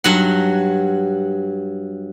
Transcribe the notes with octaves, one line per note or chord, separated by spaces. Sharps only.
G2 F#3 F#5